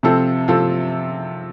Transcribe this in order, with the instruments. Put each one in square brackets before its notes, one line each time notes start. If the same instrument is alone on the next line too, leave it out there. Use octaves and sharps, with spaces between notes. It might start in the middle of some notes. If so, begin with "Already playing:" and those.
[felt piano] C3 F3 C4 F4 A4
C3 F3 C4 F4 A4